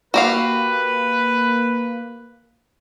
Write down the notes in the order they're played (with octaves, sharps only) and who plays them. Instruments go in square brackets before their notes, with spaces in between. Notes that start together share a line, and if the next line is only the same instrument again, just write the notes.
[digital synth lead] A#3 [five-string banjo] F#4 G4 F5 [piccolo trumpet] B4